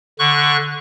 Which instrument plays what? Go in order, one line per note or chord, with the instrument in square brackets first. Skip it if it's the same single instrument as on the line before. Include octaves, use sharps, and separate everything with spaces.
[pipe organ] D3 C#6 F#6